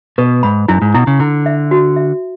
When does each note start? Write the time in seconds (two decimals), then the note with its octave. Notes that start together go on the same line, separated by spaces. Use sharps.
0.18 B2 B4
0.43 G#2 B5
0.68 F#2 E4
0.82 G#2
0.94 B2 E4
1.07 C#3
1.20 D3 E4
1.46 E5
1.71 F#4
1.96 E5